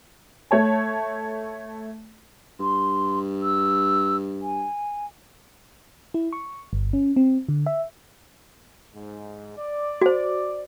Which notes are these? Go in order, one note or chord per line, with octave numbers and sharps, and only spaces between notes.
A3 C#5 A5
G2 C6
E6
G#5
E4
C#6
G1
C#4
C4
D3
E5
G#2
D5
F#4 C5